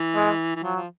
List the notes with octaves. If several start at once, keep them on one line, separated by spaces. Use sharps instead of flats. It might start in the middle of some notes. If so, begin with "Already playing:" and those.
Already playing: E3
G#3
E3
F3 F#3
F3